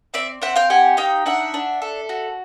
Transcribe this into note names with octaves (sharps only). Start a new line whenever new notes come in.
C4 D5 E5
C4 E5 F#5
F5 G5
G4 F#5 G#5
D#4 F5 G5
D4 E5 F#5
D4
A4
F#4